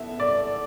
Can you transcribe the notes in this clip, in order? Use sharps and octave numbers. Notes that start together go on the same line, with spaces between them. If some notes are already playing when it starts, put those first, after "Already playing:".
Already playing: B3 E4 A4 E5
D5